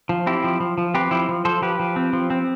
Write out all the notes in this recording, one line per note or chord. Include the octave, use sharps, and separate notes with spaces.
F3
C4 E4 G4
F3
F3
F3
C4 G4 B4
F3 E4 G4
F3
F3 A4 C5
F3 G4 B4
F3
C4
F3
C4